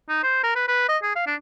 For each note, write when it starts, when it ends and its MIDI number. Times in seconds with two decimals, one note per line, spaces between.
0.09 0.19 63
0.23 0.42 72
0.43 0.55 70
0.55 0.63 71
0.68 0.88 71
0.89 0.97 75
1.02 1.14 68
1.15 1.26 77
1.27 1.35 62